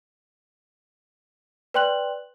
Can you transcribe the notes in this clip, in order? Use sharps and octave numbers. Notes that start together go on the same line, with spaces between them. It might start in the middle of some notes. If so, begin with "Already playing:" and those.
B4 D5 G5 C6 F#6 F#7